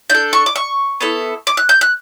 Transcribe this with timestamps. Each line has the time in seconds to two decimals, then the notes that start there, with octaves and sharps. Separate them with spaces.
0.10 D4 A4 G6
0.33 C#6
0.46 D6
0.56 C#6
1.01 B3 E4 A4
1.47 D6
1.57 F#6
1.69 G6
1.81 F#6